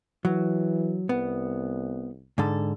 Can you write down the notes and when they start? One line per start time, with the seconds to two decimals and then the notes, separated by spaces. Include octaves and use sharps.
0.25 E3 F#3
1.09 C2 B3
2.38 G#2 D3 A4